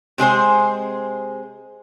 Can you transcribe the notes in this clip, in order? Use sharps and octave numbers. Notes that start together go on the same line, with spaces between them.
C3 G#3 G#4 C5